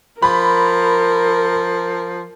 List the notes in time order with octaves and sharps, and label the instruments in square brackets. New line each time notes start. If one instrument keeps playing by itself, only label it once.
[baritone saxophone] F3 [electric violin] A#4 [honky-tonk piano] B5